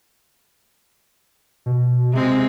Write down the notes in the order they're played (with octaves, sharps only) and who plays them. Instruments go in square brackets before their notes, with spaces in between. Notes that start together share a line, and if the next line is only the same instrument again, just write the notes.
[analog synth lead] B2
[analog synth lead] C3 [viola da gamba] G#3 C4